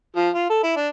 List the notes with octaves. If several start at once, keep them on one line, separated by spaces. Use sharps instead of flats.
F3
F4
A4
E4
D4